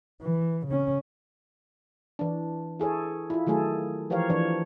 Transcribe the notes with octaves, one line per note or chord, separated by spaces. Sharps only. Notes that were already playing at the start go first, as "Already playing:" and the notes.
E3
C#3 C#4
E3 D4
E4 G#4 A4 C#5
E4 F4
D#3 F#3 A3 G#4 A4
E3 F3 G4 A#4 C#5 F5
E3 F3 D4 C#5